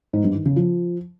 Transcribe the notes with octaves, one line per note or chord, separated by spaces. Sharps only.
G#2
G2
D#3
C#3
F3